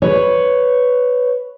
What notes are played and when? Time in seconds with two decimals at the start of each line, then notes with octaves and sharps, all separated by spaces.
0.02 B4 C#5